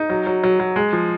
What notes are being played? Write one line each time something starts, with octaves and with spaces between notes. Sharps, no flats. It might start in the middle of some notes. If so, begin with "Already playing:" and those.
Already playing: D#4
F#3
F#3
F#3
F#3
G#3
F3